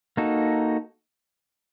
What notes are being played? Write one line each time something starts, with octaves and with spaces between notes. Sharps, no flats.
A#3 D#4 F#4 A4